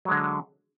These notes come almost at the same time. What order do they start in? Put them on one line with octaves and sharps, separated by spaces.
F#3 G#3 D3